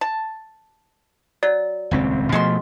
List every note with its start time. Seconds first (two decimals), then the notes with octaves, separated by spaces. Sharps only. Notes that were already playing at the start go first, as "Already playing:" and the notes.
0.01 A5
1.43 F#3 D5
1.91 D#1 C#2 C4
2.32 B2 F3 G#3 A3 F#4 C6